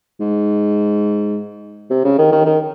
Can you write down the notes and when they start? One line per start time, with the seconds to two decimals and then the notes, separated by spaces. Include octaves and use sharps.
0.20 G#2
1.90 C3
2.04 C#3
2.18 D#3
2.32 D#3
2.45 D#3